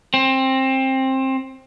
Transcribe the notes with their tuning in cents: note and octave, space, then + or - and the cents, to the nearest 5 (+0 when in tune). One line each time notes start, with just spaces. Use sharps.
C4 +20